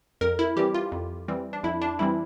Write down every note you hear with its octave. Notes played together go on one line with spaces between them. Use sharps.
F2 A#4
E4
E3 G3 C4 G4
F4
F2
E3 G3 C4
D4
F2 E4
D4
E3 G3 C4 E4